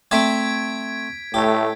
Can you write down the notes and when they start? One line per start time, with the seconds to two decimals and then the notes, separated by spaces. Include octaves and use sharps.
0.11 A3 C4 D5 G#6 B6 D7
1.34 A2 A3 G4